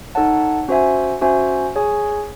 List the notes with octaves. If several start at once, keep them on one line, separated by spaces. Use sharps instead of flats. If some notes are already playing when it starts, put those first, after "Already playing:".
D#4 A4 C#5 F#5 A5
C#4 F#4 C5 E5 G#5
C#4 F#4 C5 E5 G#5
G#4 C#5 G#5